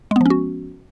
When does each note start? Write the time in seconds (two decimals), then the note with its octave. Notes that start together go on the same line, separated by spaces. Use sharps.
0.11 G#3
0.16 B3
0.21 F3
0.26 C#4
0.30 F#4